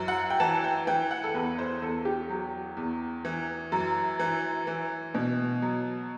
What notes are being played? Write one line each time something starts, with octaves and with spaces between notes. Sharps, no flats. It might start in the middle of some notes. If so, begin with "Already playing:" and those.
Already playing: F#2 E3
F#5
G5
E3 A5
G5
E3 G5
F#5
A4
E2 B4
C5
E2 A4
G4
F#3
E2
E3
F#2
E3
E3
B2
F#3